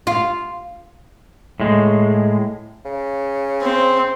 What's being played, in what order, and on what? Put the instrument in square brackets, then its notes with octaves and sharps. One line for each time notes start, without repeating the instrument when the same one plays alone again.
[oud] F4
[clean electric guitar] A2 G#3
[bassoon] C#3
[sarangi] C4